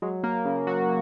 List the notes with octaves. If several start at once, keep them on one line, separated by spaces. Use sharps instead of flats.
F#3 G#3
A#3
C#3
F#3 F#4